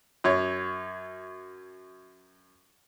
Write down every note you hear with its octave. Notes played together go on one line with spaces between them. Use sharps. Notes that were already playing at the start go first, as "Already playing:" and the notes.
F#2 C#5